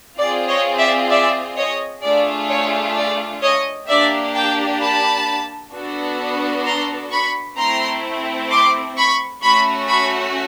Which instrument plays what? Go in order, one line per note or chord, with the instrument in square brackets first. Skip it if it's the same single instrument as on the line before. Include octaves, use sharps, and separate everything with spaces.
[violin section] C4 F4 G#4 D5
C#5 D#5
D5 E5
D5 E5
C#5 D#5
A3 D4 F4 G#4 D5
C#5
D5
C#5 D#5
A#3 D4 G4 D5 E5
G5 A5
A5 B5
B3 D4 F#4 A4
A#5 C6
B5 C#6
A3 C4 E4 A#5 C6
C6 D6
B5 C#6
A3 C#4 F#4 B5 C#6
B5 C#6